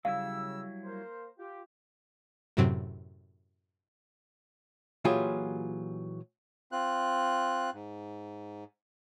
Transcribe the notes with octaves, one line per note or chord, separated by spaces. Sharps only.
C#3 F#3 G3 E4 F5 E6
A#3 A#4 C5
F4 G4
F#2 A2 C3 F#3 C4
A#2 E3 F#3 F4 G4 G#4
C4 F4 F#6
G#2